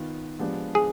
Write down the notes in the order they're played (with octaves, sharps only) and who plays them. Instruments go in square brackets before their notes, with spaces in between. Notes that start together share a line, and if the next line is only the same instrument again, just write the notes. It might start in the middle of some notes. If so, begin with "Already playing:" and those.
Already playing: [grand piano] D#3 B3 F4
F3 G#3 B3 D4 G4
[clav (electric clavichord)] G#4